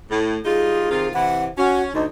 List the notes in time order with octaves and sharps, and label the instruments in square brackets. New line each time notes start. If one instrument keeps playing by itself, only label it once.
[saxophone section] A2
[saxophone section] G3 D#4 F4 [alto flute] G#4
[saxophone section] C3 D#3 F4
[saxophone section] C3 E3 [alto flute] F#5
[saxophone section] C#4 [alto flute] F#4
[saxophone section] D2 [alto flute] D#4